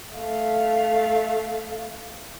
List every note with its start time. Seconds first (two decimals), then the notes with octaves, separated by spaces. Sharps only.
0.15 A3 F5